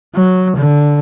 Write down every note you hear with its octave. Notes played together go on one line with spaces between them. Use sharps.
F#3
D3